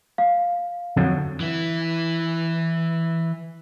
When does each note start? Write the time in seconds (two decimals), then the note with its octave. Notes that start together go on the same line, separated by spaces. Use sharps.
0.18 F5
0.97 F2 D3 F#3
1.40 E3 E4